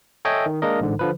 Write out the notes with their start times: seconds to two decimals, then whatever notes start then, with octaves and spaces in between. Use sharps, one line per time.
0.25 A4 C#5 D#5 E5 G5 G#5
0.46 D#3
0.62 G#3 A#3 D4 A#4 D#5
0.80 A1 G#2 D3
0.99 D3 F3 B4